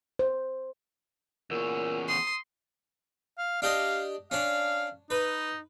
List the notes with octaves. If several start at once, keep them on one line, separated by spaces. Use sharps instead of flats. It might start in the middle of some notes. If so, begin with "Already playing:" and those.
C5
E2 A#2 C#4 E6
C6 D#6
F5
D4 G4 D#5 F5
C#4 D4 F5
D#4 B4